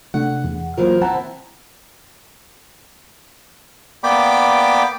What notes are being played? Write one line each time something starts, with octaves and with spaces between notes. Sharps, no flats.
C3 A3 D4 F#5
E2
E3 F#3 A#3 F4 A#4 C5
C4 E4 F#5 A5 A#5
A#3 B3 D5 G5 B5 D6